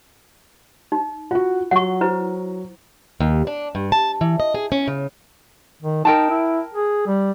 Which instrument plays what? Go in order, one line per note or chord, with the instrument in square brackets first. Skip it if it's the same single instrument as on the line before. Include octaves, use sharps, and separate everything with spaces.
[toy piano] D#4
[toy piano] F4 [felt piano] F#4 F#5
[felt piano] F#3 [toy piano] F#5 C#6
[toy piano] E4 B4 C5
[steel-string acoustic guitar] D#2
D4
G2
A5
E3
D#5
G#4
C#4
C#3
[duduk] D#3
[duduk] D#4 [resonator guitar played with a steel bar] A#4 G5 A5
[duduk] E4
G#4
G3